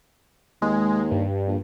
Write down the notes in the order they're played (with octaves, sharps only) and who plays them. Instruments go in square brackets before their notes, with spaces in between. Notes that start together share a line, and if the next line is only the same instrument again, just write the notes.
[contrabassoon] D#2 [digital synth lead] G#3
[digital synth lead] G2
[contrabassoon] A#1